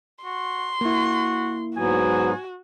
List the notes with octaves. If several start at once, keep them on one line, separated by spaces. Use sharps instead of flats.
F#4 C6
A#3 E4 F#4
G#2 F#3 B3 F#4 G#5